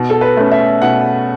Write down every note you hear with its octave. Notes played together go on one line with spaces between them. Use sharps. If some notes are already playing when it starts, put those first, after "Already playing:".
Already playing: B2
A4
B4
A3 C#4
E5
B2 F#5